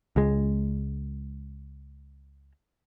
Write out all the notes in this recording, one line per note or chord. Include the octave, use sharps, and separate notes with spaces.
C#2 G#3